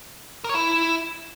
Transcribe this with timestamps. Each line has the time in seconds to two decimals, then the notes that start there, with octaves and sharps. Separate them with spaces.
0.44 A#4
0.49 C#5
0.54 E4